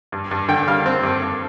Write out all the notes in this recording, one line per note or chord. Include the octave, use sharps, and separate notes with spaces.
G2
G2
D3 G5
G3 F5
C4
G2
G2